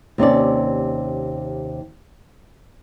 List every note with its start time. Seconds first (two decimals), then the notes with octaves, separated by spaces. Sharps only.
0.18 D#2 C3 C#4 D5